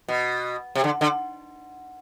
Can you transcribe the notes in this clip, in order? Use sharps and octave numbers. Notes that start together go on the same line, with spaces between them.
B2
C3
D3
D3